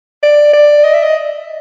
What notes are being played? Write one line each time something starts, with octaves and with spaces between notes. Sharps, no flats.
D5
D5
D#5
E5
D#5